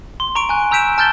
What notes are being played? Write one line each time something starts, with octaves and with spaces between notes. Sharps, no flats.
C6
A#5 C#6 D7
G#5 F#6
A#5 E6 G6 B6 D7 E7
A5 F6 G6 A6 G7